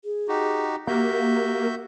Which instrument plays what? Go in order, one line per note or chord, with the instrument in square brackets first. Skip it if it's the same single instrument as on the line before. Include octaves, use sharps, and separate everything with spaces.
[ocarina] G#4
[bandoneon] D#4 F#4 G4
[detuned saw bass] A#3 [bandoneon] F#4 E5 G6 [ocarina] G4